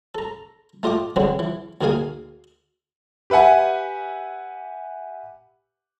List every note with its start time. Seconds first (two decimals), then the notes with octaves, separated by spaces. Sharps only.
0.15 A4 A#5
0.83 A3 F4 D#5 G5 D6
1.16 B2 D3 F#3 G#3 B3 C4
1.39 E3
1.81 D2 D#3 A#3 G#4 F5 G#5
3.30 G4 B4 E5 F#5 G#5